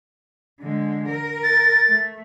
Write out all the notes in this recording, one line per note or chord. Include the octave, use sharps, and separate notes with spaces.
D3 G#3
A#4
A6
A3